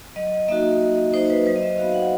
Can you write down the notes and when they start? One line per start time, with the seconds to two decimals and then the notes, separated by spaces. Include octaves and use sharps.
0.16 F#3 D#5
0.48 A#3 D#4 F#4 E5
0.81 F#3 D#5
1.14 A#3 D#4 F#4 C5
1.26 C5
1.30 B4
1.46 F#3 C5
1.56 D#5
1.62 E5
1.78 B3 D#4 F#4 F5
1.94 F#5